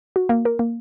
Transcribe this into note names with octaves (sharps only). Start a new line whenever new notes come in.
F#4
A#3
A#4
A#3